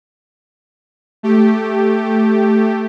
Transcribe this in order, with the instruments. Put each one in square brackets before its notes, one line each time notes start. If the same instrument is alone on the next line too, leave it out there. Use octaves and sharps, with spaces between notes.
[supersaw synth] A3 G4